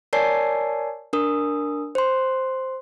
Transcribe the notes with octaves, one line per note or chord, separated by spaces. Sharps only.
A#4 C#5 D5 G#5 A5 C7
D4 A#4 D#6
C5 C6